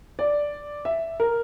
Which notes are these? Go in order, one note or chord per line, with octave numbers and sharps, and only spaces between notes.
D5
E5
A#4